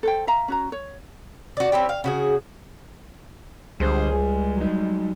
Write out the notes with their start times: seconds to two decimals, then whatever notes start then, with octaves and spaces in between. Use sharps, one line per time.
0.03 A4 C5 G5
0.27 E5 F5 A#5
0.48 C#4 F#4 A#5
0.72 C#5
1.57 F#4 D5
1.72 C4 C#4 E4 G4
1.89 F5
2.04 C#3 F#4 G#4
3.80 C#2 D3 G3 G#4 C5
4.10 G3 G#3 G#4
4.57 F#3 D#4